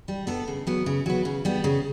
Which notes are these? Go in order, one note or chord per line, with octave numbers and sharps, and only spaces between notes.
G3
B3 D4 A4
C#3
F#3 B3
C#3
F#3 B3
C#3
G3 B3
C#3